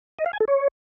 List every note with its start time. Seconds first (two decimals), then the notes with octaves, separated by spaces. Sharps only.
0.19 D#5
0.26 F5
0.33 G#5
0.40 A4
0.48 C#5